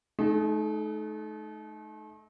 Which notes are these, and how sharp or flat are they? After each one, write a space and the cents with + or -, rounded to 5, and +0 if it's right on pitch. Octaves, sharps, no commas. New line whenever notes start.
A3 -35 D#4 +0 G#4 +10